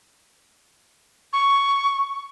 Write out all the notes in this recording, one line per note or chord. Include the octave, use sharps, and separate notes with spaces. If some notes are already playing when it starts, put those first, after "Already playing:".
C#6